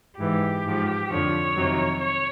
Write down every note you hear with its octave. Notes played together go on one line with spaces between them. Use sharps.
G#2 E3 G4
G#2 F3
F2 D3 F3 C#5
F2 C3 D#3 F#3
C#5